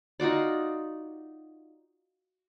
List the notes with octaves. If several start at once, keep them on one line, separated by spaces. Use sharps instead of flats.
D#4 F4 F#4 D5